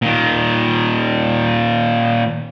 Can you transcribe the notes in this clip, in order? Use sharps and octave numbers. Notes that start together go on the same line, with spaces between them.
A#2 D#3